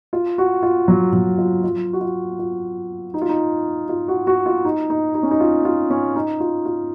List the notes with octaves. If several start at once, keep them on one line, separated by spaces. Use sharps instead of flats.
F4
F#4
F4
F#3
F#3
F4
F4
F#4
F4
F4
D#4
F4
D#4
F4
F#4
F#4
F4
D#4
D#4
D#4
C#4
D#4
F4
F4
C#4
D#4
F4
F4